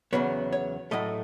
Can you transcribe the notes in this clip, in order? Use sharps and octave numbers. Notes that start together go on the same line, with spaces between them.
E2 C#3 F#3 B3 C#5
C#5
A2 F#3 A3 D#5